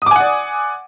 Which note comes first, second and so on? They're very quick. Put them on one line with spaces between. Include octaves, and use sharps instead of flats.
D#6 D6 G#5 F#5 D5